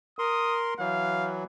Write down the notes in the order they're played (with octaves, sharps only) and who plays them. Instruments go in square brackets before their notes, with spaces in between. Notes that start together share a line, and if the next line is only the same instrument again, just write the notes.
[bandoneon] A#4 C6 [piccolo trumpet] D#6
[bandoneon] E3 F#3 [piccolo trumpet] F5